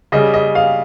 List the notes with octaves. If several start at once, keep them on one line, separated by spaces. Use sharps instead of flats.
C#3 G3 D#5
D#5
F5